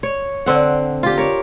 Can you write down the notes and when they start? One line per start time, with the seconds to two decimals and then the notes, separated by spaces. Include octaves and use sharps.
0.03 C#5
0.46 D3 C4 F#5
1.03 F4 G4
1.17 A#4 C#5